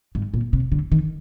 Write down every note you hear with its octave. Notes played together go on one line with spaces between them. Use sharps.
G#2
A#2
C3
D3
D#3